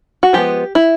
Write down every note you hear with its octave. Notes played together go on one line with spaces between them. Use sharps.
F#4
F3 G#3 B3 G4
E4